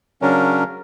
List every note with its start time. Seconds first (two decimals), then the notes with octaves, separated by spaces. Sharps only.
0.22 C#3 F#3 C#4 D4 A#4